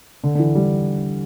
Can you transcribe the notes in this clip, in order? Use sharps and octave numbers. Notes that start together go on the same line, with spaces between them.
D3
D3
E3
G3